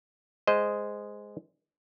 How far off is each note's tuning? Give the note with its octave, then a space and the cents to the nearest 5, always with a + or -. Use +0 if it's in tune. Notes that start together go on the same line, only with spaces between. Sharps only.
G#3 +0 C5 -15 D#5 +0